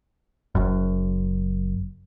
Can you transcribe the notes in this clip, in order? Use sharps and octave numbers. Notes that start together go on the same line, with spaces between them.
F#1 F#2